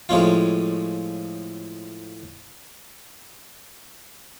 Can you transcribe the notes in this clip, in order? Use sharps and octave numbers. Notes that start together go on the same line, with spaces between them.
A2 F3 G#3 C#4 F4